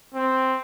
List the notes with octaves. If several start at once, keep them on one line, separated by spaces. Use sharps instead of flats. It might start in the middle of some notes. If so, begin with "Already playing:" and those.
C4